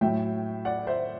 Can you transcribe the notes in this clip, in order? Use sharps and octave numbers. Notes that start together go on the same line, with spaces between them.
A2 F#3 E5 G5
D5 F#5
C5 E5